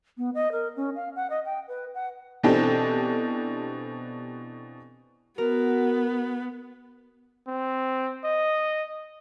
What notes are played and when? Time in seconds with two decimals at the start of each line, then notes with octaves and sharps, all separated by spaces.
0.17 B3
0.34 D#5
0.52 A#4
0.76 C#4
0.95 F5
1.16 F#5
1.30 D#5
1.45 G5
1.68 B4
1.94 F#5
2.43 B2 E3 C4 D4 G4 A4
5.38 B3 F#4 A#4
7.48 C4
8.24 D#5